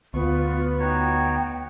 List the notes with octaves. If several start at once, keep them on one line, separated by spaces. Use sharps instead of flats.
D2 B3 F4 C#6
D#4 F#4 C#5 G5